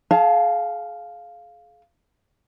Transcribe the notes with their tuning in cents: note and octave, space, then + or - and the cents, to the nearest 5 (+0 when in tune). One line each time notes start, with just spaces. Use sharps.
G#4 +40 F5 +0 A5 +0